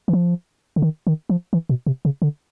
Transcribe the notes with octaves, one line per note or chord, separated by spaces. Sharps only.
E3
F3
D3
D#3
D#3
F3
E3
B2
C3
C#3
D3